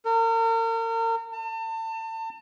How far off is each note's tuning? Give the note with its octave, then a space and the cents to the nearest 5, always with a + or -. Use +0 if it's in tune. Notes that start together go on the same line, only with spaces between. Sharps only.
A#4 -40
A5 +35